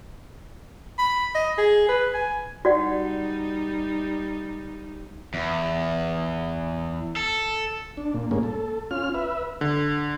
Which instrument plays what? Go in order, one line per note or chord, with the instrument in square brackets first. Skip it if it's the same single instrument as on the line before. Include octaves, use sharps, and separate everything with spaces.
[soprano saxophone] B5
D#5
G#4
B4
G#5
[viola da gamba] G3 D#4 [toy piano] F#4 D5 F#5
[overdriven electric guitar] E2
A4
[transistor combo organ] D4
A#2
G2 A#2 G#3 A#3 C#4
A4
C#4 F4 F6
B4 E5
[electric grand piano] D3